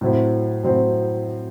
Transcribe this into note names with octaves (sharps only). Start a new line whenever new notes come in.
A2 F#3 C4 E4
A2 F#3 C4 E4